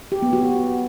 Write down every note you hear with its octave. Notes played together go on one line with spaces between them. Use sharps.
G4
B3
F#4